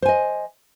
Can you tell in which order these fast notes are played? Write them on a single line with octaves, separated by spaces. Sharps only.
C5 G#5 D#5